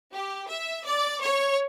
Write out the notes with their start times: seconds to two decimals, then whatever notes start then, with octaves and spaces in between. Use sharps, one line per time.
0.13 G4
0.50 E5
0.86 D5
1.22 C#5